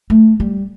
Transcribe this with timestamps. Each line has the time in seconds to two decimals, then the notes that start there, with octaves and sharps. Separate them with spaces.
0.10 A3
0.40 G3